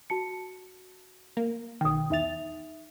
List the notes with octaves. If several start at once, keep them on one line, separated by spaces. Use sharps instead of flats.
F#4 A5 C#7
A#3
B1 D#3 G5 D#6
E2 D#4 E5 A6 F7